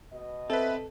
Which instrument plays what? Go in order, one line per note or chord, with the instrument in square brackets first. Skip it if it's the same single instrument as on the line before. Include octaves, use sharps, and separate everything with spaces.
[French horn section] B2 D#5
[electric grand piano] C4 B4 [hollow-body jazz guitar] A4 [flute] E5